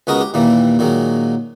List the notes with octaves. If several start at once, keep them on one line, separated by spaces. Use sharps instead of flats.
C#2 G#3 B3 F#4 A#4 D#5
G4
D#2 A#2 E3 G3 A#3
A#2 D#3 F#3 G#3